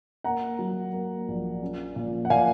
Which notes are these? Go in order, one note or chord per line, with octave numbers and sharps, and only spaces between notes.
A#3 F#5 A#5
F#3
A#3
A#1
C#4
A#2
F#5
A#2 F5 G#5